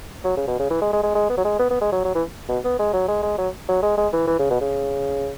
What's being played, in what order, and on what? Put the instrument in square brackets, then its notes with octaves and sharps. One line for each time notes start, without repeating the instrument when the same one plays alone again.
[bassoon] F#3
C#3
B2
C#3
E3
G#3
G#3
G#3
G#3
B3
F#3
G#3
B3
B3
G#3
F#3
F#3
E3
B2
B3
G#3
F#3
G#3
G#3
F#3
F#3
G#3
G#3
E3
E3
C#3
B2
C#3